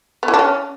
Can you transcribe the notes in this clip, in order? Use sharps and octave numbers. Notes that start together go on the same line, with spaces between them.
B3
E3
D4
C#4